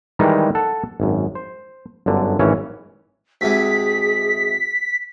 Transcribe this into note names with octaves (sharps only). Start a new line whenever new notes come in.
D#3 E3 G3 G#3 D#4
A4 F#5 A5
G#1 F#2
C5
G1 F#2 D3
G#1 E3 C#4 C#5
D2 C3 G#3 G#4 B6